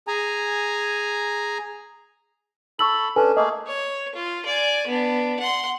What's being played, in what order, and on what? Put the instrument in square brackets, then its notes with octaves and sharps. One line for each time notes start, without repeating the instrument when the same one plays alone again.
[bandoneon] G#4 G#5 A#5
[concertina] A4 B5 [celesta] C#6 E6 F#7
[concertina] C#4 D4 [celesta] A4 B4 G#5
[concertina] A3 A#3 G#4 [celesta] D#5
[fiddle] C#5
F4
D5 G#5
B3 D4
F#5 C6